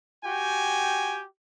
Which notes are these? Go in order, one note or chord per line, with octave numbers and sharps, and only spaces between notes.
F#4 G4 G5 G#5